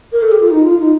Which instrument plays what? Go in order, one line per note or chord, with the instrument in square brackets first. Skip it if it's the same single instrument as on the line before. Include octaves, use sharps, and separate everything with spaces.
[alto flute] A#4
A4
G4
F4
D#4
F4
D#4